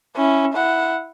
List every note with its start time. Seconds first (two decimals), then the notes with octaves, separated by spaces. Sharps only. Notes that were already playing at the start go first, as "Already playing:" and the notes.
0.16 C#4 E4
0.54 E4 F#5